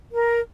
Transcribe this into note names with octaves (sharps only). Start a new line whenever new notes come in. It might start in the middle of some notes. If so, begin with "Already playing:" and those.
A#4